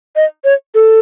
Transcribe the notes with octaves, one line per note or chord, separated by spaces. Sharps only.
D#5
C#5
A4